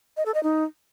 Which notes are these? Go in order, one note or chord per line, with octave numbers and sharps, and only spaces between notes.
D#5
A4
D#5
D#4